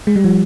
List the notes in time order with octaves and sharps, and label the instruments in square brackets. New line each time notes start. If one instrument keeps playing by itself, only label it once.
[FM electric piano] G#3
G3
F3